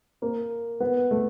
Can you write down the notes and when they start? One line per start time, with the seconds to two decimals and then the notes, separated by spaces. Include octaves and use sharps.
0.22 A#3
0.80 B3
1.11 A3